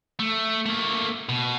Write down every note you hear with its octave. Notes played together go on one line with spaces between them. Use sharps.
A3
A3 A#3
B2